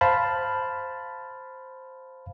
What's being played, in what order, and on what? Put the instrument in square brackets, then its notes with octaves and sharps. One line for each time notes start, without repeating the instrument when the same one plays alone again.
[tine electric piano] C5 F5 A5 B5